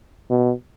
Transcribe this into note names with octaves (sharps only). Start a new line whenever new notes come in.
B2